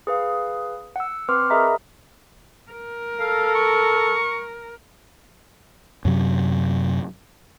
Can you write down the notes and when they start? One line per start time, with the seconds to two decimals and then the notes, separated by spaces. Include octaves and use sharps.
0.07 G#4 B4 F5
0.96 F#5 E6
1.29 C4 B4 F#5 C6 D6 F6
1.50 G#4 A#4 D#5 E5 A#5 B5
2.72 A#4
3.20 A4 F5
3.55 C#6
6.05 F#2 C3 F#3